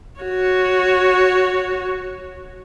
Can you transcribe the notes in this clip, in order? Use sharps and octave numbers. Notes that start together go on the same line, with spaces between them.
F#4 C#5